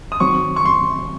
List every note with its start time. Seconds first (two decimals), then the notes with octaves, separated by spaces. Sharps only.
0.12 D#6
0.20 D#3 F#3 C4 C#6
0.56 C#6
0.65 C6